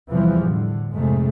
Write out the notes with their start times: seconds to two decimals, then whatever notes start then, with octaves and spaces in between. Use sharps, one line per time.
0.10 E2 C3 E3 F3 G3
0.47 A2 D3
0.92 F2 G#2 C3 G#3 A3